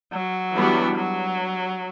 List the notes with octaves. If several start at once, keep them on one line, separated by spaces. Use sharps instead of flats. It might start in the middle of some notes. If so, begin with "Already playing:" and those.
F#3
E3 G3 B3 D4 F#4
F#3